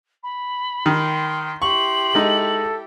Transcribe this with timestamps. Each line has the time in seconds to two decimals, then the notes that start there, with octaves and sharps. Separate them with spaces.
0.23 B5
0.86 D#3 G5 C6
1.62 E4 G4 C6 C#6 F#7
2.15 G#3 D#4 A4